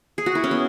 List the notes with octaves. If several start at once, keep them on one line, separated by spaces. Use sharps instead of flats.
G#4
F#4
E4
C#4
B3